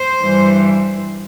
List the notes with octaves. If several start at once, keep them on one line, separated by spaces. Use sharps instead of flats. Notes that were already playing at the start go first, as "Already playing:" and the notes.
Already playing: C5
G2 E3 G3